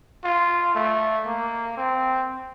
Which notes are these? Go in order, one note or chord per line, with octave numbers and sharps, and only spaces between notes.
F4
A3
A#3
C4